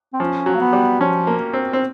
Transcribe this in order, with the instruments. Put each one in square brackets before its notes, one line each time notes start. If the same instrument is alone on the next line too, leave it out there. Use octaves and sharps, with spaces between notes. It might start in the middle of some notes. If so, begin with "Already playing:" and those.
[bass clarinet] C4
[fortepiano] F3 [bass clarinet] C#4
[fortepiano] F#3
[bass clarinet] A#3
B3
[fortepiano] G3
[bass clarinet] F3 [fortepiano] C#4
[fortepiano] A#3
C4
C4